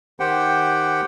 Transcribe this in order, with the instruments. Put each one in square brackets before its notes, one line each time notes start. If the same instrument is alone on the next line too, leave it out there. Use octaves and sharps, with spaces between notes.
[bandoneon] D#3 G4 C5 F#5 G5